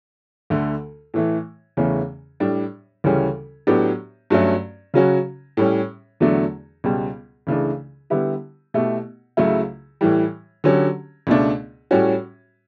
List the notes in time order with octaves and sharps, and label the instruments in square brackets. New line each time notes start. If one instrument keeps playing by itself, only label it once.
[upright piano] D2 D3 A3
A2 E3 A3
E2 C#3 E3 A3 C#4
A2 G3 D4
D2 C#3 E3 G3 C#4
A2 F#3 B3 D4 G4
G2 F#3 A3 C#4
C#3 F#3 C#4 F#4
A2 G3 C#4
E2 D3 F#3 A3 D4
C#2 B2 G3
C#2 C#3 E3 A3 D4
D3 G3 B3 E4 G4
B2 A3 E4 G4
C#2 C#3 F#3 A3 E4
A2 E3 G3
D3 F#3 C#4 G4
C#2 B2 A3 D4
A2 G3 C#4 F#4